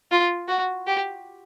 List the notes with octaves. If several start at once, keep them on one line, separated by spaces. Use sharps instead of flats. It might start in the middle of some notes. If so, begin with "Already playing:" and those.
F4
F#4
G4